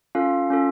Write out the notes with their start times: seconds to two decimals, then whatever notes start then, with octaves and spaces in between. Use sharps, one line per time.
0.15 C#4 F4 A4 F5
0.50 C#4 F4 A4